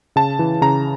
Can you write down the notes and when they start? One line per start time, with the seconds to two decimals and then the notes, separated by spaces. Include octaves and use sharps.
0.16 C#3 A5
0.39 E3
0.62 C#3 A#5